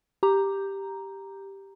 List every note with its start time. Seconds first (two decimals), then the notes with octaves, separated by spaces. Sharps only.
0.23 G4 A#5